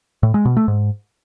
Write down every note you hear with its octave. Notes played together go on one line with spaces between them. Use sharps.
A2
G#3
B2
A3
G#2